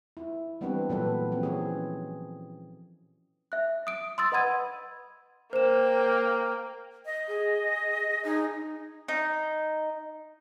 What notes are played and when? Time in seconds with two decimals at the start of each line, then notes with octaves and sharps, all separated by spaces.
0.17 E4
0.61 E3 G3 B3 C4 D4 B4
0.89 A#2 E3 F#3 B3 A4 B4
1.32 E3 F3 C4
1.43 C#4 G#4
3.52 E5 F#6
3.87 D#6 D7
4.18 C6 D#6 E6 A6
4.32 B4 D#5 F#5 B5 G#6 D#7
5.53 A#3 C5 G5 E7
7.06 D#5
7.28 G#4
8.25 D#4 G#4
9.08 D#4